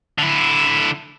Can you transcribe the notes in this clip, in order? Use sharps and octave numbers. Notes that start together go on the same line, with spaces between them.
D3 E4